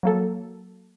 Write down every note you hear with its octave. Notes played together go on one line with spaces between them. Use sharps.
F#3 A#3 A4